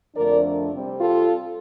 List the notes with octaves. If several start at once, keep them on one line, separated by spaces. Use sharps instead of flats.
F2 D3 F3 A3 D4 A#4 D5
C3 G3 C4
F4 A4